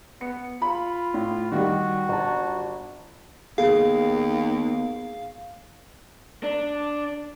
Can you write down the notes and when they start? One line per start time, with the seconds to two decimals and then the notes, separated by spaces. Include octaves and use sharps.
0.21 B3 C#7
0.62 F4 B5
1.14 A2
1.52 D#3 G3 F#4
2.09 G1 A5
3.58 D#2 B3 G#4 F5
6.43 D4